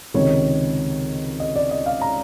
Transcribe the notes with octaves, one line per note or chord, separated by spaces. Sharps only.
C#2 C3 D#3 C#5
D#5
D5
D#5
F5
A#5